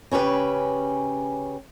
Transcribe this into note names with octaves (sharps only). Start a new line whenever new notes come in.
C#3 C#4 G4 B4